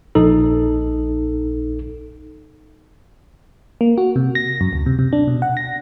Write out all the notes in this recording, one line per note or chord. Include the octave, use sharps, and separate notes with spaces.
A#1 D#4 A4
A#3
F#4
C3
A#6
F#2
D2
C3
C3
D4
B2
F#5
A#6